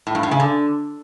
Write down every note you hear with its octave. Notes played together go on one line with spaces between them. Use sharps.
A2
G2
A2
C#3
D3